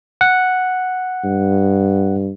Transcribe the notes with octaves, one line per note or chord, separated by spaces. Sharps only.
F#5
G2